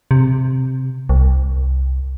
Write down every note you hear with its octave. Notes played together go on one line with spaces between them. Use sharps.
C3
C2